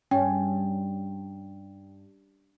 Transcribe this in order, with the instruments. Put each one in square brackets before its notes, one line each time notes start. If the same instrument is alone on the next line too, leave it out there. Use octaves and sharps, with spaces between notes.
[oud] G2 [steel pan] C#4 [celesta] G5